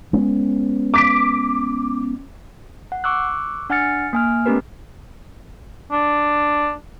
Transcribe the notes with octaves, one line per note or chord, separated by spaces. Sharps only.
G#3 B3 C#4
D6 B6 D7
F#5
C#6 D6 E6 F#6
D4 F#5 G#5 F6 A6 C#7
A#3 G#5 F6
A3 B3 C#4 G4 A#4 B4
D4